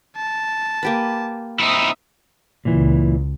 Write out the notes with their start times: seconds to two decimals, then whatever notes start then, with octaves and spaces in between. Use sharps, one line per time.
0.17 A5
0.83 A#3 G4 B4
1.59 C4 D#4 E4 E5 D#6
2.65 C#2 A#2 E3